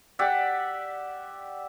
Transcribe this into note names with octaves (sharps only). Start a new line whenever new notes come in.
G4 D5 E5 F#5